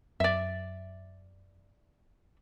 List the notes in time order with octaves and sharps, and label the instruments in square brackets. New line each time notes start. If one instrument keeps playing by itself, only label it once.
[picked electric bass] F#2 [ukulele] D5 E5